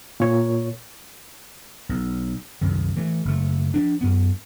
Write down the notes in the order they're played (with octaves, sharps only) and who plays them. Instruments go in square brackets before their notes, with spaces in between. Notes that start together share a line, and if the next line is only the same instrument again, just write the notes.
[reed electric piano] A#2 C#5
[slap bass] B1
C2 F#2 D#3
E3 A3
F#1 A3
F3 D4
F#2 B3